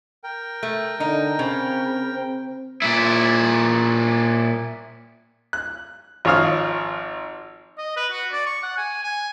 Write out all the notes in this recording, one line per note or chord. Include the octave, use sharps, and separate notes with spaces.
A#4 G5
A3
D3 D#4
C#3 C4
C4
A#2 E4
F#6
G#1 F3 C#5 F5 D#6 F6
D#5
B4
F#4
D5
C#6
F#5
G#5
G#5